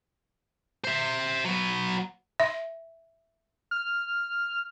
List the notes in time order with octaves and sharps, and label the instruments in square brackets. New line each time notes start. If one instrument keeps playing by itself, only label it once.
[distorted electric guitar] C5 E5
F#3 B3
[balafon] E5
[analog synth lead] F6